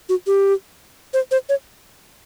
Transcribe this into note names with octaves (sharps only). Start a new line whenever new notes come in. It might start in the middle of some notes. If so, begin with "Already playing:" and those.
F#4
G4
C5
C5
C#5